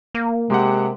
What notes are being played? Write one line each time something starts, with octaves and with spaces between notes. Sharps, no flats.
A#3
C3 G#3 G4 F#5